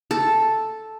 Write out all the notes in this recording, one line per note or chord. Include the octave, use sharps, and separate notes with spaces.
A4